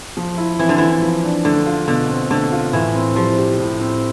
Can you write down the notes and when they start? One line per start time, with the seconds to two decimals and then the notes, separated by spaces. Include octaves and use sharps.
0.17 F3
0.37 E4
0.59 E3 C4
0.69 D3
0.78 E3 F3
1.02 F3
1.24 D4
1.45 D3 A3
1.66 F4
1.88 B2 D3
2.09 C4
2.30 D3 A3
2.52 F4
2.73 A2 E3
2.94 C4
3.16 F3 G3
3.37 G4
3.58 A2
3.80 C4